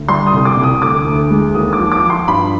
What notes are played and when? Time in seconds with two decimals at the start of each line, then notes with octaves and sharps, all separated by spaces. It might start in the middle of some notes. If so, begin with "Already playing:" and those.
Already playing: D2
0.08 G3 C6
0.27 D#6
0.33 C2
0.45 D6
0.57 C2
0.63 D#6
0.82 D2 D6
1.06 D2
1.31 G#3
1.55 D#2 D#6
1.73 D6
1.79 F3
1.92 D6
2.04 F3
2.10 C6
2.28 G2 B5